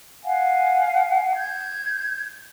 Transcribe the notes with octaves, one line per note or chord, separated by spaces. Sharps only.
F5 F#5 G#5
G6 G#6